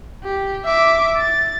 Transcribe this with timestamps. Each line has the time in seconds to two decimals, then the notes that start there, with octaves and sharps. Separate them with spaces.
0.23 G4
0.65 E5 D6
1.17 A6